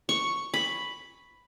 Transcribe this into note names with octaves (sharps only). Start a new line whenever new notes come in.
C#6
B5